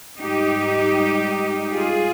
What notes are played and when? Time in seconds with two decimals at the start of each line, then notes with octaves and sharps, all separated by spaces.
0.19 G#2 G3 D#4 G4
1.73 F4 G#4